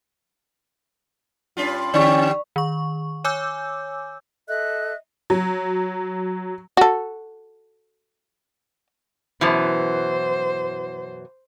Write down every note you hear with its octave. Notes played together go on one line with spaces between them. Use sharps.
G2 C#4 F4
D3 C#4 G4 D5 C#6
D#3 C#6
C#5 G#5 D6 E6 G6
A4 D#5 E5 F#6
F#3
F#4 A4
F#2 B2 E3 C5